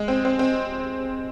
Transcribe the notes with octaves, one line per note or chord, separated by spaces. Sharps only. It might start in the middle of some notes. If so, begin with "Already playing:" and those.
Already playing: G#3
C4
C4
C4